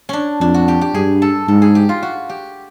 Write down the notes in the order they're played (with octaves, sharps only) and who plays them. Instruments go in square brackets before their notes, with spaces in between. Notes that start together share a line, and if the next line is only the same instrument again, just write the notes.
[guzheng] C#4 D4
[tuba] F2 [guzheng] D4
[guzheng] F#4
G4
G4
[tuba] G2 [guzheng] G#4
[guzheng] A4
[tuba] G#2 [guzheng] A4
[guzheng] G#4
G4
F4
F#4
G4